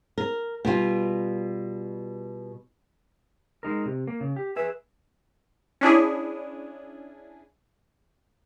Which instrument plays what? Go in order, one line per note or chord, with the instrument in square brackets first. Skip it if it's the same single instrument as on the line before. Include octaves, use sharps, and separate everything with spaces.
[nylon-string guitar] A#4
B2 G3 F4
[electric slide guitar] G#3 D#4 A#4
C3
A#3
C#3
G4
[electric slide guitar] G#4 E5 [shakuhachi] B4
[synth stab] C#4 D4 E4 G#4